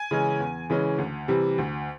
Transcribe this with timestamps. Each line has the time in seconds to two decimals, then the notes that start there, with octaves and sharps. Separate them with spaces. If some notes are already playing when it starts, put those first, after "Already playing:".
Already playing: G#5
0.11 C#3 E3 G#3 C#4
0.40 E2
0.70 C#3 E3 G#3 C#4
0.98 D2
1.28 C3 E3 G3
1.58 D2